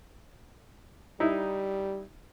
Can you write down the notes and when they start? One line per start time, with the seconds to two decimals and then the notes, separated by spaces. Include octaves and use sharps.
1.20 G3 D#4 E4